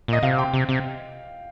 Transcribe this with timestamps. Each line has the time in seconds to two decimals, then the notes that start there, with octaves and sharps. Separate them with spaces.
0.08 A#2 D#5
0.23 C3 F5
0.39 G5
0.54 C3
0.69 C3